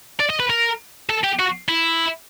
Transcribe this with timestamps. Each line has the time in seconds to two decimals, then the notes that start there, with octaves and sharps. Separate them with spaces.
0.20 D5
0.30 D#5
0.40 B4
0.50 A#4
1.09 A4
1.24 G4
1.39 F#4
1.69 E4